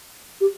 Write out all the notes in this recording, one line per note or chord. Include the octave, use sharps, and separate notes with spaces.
G4